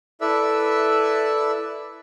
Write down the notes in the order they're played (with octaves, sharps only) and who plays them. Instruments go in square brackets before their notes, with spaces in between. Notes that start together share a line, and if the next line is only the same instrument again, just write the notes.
[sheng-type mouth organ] E4 A4 B4 D5 E5 E6